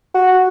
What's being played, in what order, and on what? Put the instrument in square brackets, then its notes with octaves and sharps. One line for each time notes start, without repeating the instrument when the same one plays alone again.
[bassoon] F#4